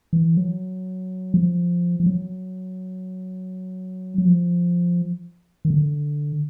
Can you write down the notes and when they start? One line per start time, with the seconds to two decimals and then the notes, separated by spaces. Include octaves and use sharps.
0.13 E3
0.37 F#3
1.34 F3
2.00 F3
2.06 F#3
4.18 F#3
4.25 F3
5.65 D#3
5.70 D3